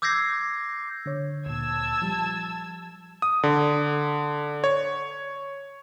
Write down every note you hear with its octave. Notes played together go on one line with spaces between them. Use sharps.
D6 E6 G6 G#6 A#6 C7
D3 C#5
D2 A#2 A5 E6 G#6
F3 G3
D#6
D3
C#5